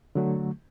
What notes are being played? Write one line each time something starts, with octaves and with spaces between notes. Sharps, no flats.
D3 F#3 A3